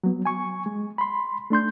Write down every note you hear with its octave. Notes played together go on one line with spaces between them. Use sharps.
F#3 B3
G#5 C#6
G#3
B5 C6
A3 D4 C6 G6